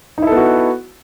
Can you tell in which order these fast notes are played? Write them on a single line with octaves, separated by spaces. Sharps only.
D#4 E4 A4 B3 F#4